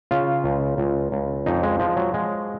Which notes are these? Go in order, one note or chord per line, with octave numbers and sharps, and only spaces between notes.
C#3 F4
C#2
C#2
C#2
F2 D#4
G#3
F3 G#3
F#3
F3 G#3